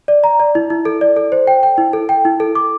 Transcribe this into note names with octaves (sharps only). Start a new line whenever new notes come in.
D5
A#5
D5
E4
E4
A4
D5
A4
C5
G5
G5
E4
A4
G5
E4
A4
D6